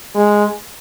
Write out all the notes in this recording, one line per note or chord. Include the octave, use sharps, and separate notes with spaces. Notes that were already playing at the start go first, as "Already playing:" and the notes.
G#3